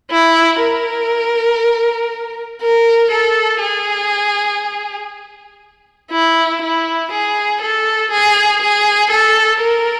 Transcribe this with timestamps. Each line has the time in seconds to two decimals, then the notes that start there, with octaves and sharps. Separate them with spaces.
0.11 E4
0.61 A#4
2.62 A#4
3.11 A4
3.61 G#4
6.11 E4
6.62 E4
7.12 G#4
7.62 A4
8.11 G#4
8.62 G#4
9.11 A4
9.61 A#4